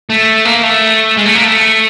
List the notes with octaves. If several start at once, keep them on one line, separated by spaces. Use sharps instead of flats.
A3
A#3
A3
G#3
A3
A#3
A3